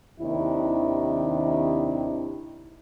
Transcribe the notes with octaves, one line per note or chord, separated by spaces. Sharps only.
D#2 C3 D#3 D4 E4